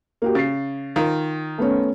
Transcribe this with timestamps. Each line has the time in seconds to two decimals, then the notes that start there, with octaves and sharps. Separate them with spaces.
0.22 A#3 F#4 G4
0.35 C#3 A6 C7
0.96 D#3 F4
1.58 A3 B3 C#4